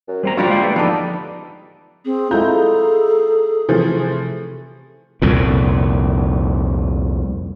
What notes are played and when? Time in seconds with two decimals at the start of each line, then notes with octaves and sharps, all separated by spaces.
0.08 F#2
0.23 C3 G3 C4 A#5
0.37 D3 G3 A#3 F4 F#4 A#5
0.49 G#3 F5 G5
0.63 E2 A3
0.76 F3 B3 D4 D#4 G4 A4
2.05 C4 G#4
2.31 G#3 E4 F4 A4 A#5 G6
3.69 C3 E3 F3 A3
5.22 C2 F2 A#2